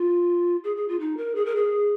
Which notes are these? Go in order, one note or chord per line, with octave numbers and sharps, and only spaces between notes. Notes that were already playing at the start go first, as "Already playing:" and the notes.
Already playing: F4
G#4
G#4
F4
D#4
A#4
G#4
A#4
G#4